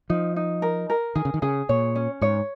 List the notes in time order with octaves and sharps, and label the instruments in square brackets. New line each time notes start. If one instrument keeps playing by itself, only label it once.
[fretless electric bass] F3 [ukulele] D#4
[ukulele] D#4
A#4
A#4
[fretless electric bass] D#3 [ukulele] G#4
[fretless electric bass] C#3
D#3
[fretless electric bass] C#3 [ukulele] G#4
[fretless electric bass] A#2 [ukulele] C#5
[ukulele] C#4
[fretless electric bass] G#2 [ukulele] C#5